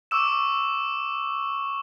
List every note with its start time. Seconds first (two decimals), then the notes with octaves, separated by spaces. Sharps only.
0.11 C#6 D6 E6 E7